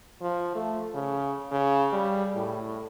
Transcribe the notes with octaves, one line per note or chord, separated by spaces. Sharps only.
F3
A3
C#3
C#3
G3
A2